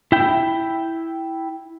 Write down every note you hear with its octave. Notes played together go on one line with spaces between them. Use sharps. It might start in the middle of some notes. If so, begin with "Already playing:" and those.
E4 G5